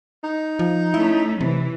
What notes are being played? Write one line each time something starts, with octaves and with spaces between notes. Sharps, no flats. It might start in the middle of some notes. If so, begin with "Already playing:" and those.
D#4
F3
A3 C#4 E4
C3 E3